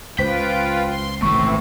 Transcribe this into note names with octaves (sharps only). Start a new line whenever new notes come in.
C#2 F4 B4 C5 G5 B6
C6
G#1 C#2 A#2 E3 A3 C4 E4 C#6